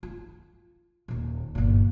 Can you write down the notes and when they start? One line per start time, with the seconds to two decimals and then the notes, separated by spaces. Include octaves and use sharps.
0.03 F4
1.08 D#1 D#2
1.55 G1 A#2